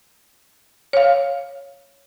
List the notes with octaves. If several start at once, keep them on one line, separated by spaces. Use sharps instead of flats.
C#5 F5